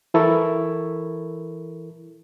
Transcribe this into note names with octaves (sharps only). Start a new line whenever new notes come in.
E3 E4 A4 A#4 C#6